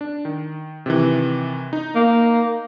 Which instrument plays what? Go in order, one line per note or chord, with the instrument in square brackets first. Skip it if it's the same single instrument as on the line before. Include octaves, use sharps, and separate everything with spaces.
[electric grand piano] D4
D#3
C3 D#3 E3
D#4
[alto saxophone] A#3